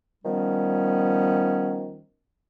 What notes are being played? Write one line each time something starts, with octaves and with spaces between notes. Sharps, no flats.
D#3 F3 G3 B3 C#4